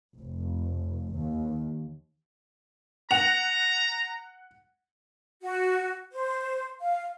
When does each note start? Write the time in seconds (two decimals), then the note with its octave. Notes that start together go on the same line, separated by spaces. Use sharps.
0.15 F1
1.15 D#2
3.11 F#5 A#5 F7
5.42 F#4
6.13 C5
6.81 F5